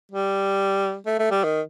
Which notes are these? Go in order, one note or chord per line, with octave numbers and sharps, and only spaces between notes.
G3
A3
A3
G3
D#3